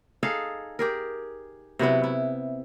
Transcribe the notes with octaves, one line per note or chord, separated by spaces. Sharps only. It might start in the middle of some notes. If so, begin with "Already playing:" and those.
D#4 G#4 A4 F5
G4 G#4 A#4
C3 F#3 B3 E4
E4